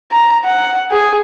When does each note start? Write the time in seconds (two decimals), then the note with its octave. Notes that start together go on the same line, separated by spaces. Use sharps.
0.12 A#5
0.45 F#5
0.91 G#4